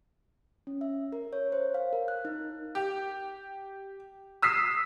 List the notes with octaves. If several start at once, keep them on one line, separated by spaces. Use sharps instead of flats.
C#4
E5
A#4
C#5
C5
F5
A#4
F#6
D#4
G4
D#6 E6 B6 C7